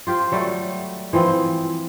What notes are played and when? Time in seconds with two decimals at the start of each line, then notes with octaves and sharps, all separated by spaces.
0.07 F4 G4 C5
0.32 F#3 G3 A3
1.13 E3 F3 C4